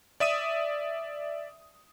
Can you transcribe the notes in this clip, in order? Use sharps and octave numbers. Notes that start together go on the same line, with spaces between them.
D5 E5 D#6 D#7